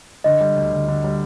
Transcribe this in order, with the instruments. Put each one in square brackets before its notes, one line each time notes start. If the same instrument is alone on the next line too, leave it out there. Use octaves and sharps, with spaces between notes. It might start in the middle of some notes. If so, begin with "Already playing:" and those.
[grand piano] D3 [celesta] D#5
[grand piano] G3
D2
D2
D3
G3